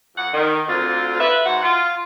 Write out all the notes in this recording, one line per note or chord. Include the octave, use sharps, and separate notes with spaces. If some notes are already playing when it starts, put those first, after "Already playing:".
F2 F#5
D#3
D2 D3 C4 F4
B4 E5
G#2 F#4 F#5
F4